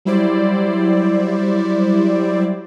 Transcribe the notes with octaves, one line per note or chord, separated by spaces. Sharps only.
F#3 G3 E4 C5 D5